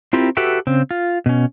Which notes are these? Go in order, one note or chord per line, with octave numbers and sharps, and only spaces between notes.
C4 E4 F4 G4 A#4
F#4 G4 A4 B4 E5 G5
C#3 C4
F4
B2 C#4